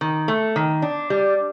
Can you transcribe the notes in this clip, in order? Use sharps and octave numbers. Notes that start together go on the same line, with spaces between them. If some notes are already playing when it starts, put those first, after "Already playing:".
D#3
A3
D#3
D4
G3